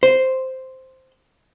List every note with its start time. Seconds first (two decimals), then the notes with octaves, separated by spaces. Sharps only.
0.03 C5